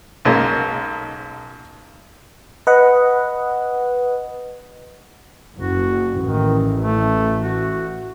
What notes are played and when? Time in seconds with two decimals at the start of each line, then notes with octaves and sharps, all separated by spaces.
0.25 B1 F#2 G#3 A#3
2.67 B4 D#5 F#5
5.59 F#1 F#4
6.22 A1 D#3
6.80 A3
7.40 F#4